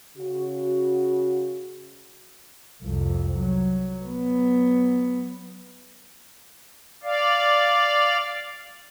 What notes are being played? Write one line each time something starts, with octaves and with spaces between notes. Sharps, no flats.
C#3 F#4
C2 F2
F#3
F#3 B3
D5 F5